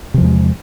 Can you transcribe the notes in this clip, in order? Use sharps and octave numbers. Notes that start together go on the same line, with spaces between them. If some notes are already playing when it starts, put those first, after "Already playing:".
E2 C3 F3 G#3